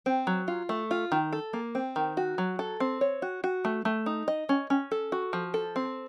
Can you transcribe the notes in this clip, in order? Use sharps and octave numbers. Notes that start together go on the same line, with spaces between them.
C4
F#3
F4
A3
F4
D#3
A4
A#3
C4
D#3
F#4
F#3
A4
C4
C#5
F#4
F#4
A3
A3
D#4
D#5
C#4
C#4
A4
F#4
F3
A4
C4